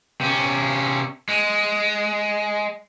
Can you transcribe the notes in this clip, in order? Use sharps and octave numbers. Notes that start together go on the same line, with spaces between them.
C3 C#4
G#3